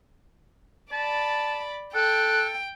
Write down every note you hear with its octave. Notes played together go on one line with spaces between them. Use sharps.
D5 A5 B5
A4 G5 F#6